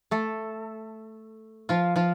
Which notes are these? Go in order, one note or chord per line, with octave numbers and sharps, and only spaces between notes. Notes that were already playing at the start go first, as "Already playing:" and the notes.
A3 A4
F3 F4
F3 F4